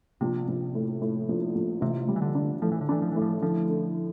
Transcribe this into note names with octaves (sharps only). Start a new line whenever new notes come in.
A#1 C3
A#1
A2
A2
A#1
A#1
A1 C3
G3
E3
D3
D4
A2 F3
E3
D3
E3 D4
F3
A2 E3
F3
D3 F3
D3